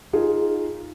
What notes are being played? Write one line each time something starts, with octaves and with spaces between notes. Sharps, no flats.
D#4 F4 G#4